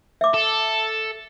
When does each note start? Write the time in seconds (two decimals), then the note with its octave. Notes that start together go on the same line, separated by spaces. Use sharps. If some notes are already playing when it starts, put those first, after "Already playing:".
0.21 E5 D6
0.34 A4